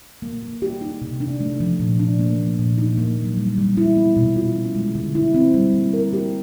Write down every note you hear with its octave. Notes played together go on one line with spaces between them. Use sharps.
A#3
A#3
G4
D#4
C3
D4
A3
F3
A#2
D4
A#3
F3
A#2
D#4
A#3
F#3
G3
G3
E4
B3
B2
F4
C#4
G#3
D3
E4
C4
G3
A#3
A#4
G4